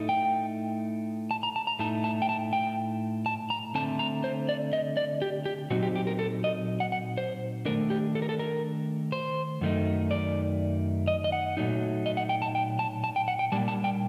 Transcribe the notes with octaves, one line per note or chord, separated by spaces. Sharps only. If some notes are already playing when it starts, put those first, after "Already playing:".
Already playing: A2 A3 D#4
G5
A5
A#5
A5
A#5
A2 A3 D#4 A5
A5
G5
A5
G5
A5
A#5
D3 A3 C4 A5
A#5
C5
D5
D#5
D5
G4
G4
A#2 F#3 C4 D#4 F#4
G4
G4
A#4
A4
D#5
F#5
F#5
C5
D#3 A3 D4 A#4
G4
A4
A#4
A4
A#4
C5
F#2 D#3 A3 D#4
D5
D#5
D#5
F#5
A#2 F#3 A3 D#4
D#5
F#5
G5
A5
G5
A5
A5
G5
F#5
G5
A#2 G3 A#3 D4 A5
A5
G5